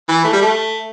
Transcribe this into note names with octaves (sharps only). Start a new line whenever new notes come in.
E3
A3
G3
A3